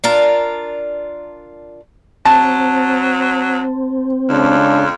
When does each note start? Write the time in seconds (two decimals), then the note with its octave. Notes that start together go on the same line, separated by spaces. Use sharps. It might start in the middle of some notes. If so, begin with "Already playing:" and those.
0.04 D4 F4 A#4
2.25 F#3 C4 A5
4.29 F2 C#3 G#3 D4